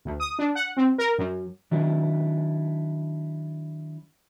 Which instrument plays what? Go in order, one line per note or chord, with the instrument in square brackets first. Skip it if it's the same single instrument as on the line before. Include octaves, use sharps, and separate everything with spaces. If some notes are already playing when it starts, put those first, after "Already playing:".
[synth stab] D2
D#6
D4
F#5
C4
A#4
F#2
[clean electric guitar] D#3 F#3 D4 E4